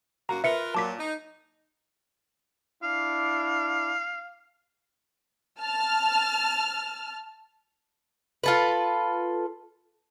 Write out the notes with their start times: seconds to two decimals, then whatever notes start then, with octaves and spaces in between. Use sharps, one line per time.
0.29 F#2 A#3 F#4 A#5
0.44 F4 A#4 B4 E5 C#7
0.74 A#2 F#3 A5 D6 B6
0.98 D#4
2.83 D4 E4 F5 D6
5.60 A5 F6
8.44 F4 A4 B4